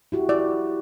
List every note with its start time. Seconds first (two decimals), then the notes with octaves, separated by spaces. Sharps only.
0.12 E4 F#4 G4
0.29 E4 D5